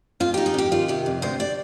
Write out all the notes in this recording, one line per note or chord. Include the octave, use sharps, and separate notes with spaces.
F2 F4
D#4 G4
G#4
F2 G4
D#3 F4
C3 G4
F2
D2 C5
D5